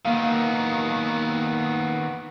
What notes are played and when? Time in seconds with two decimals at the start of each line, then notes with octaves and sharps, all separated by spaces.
0.05 D#3 A#3 B3 F5